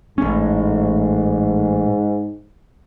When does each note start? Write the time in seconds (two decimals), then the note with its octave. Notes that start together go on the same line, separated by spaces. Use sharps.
0.18 A1 G#2 C#4